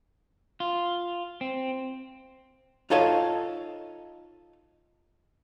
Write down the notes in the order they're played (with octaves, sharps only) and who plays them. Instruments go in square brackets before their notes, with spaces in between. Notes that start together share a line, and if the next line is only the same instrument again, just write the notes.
[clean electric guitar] F4
C4
[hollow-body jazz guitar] D#4 F4 A4 C#5 D#5